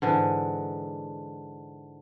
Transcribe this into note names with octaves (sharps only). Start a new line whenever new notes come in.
G#2 D3 E3